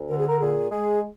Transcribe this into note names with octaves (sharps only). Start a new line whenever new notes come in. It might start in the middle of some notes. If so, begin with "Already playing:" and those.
Already playing: D2
D3 A#4
G#4
A#4
A#2 G#4
G#3 G#4